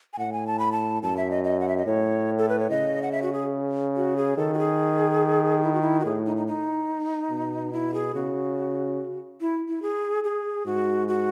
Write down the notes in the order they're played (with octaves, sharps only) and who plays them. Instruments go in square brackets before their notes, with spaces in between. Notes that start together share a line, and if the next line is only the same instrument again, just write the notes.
[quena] G#5
[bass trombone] A2 [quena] F#5
[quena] G#5
A5
B5
A5
[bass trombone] F#2 [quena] A5
[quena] E5
D#5
D#5
F#5
E5
D#5
[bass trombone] A2 [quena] C#5
[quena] A4
B4
C#5
[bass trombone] C#3 [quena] D#5
[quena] F#5
E5
F#4
G#4
F#4
G#4
[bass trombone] D#3 [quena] A4
[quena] F#4
G#4
E4
F#4
E4
F#4
[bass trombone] A2 [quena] G#4
[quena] D#4
D#4
D#4
[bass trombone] B2
[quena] E4
G#4
[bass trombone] C#3 [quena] F#4
[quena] E4
E4
G#4
G#4
[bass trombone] G#2 [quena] F#4
[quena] F#4